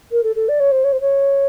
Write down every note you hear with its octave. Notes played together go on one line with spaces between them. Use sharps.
A#4
A4
A4
D5
C#5
C5
C#5
C5
C#5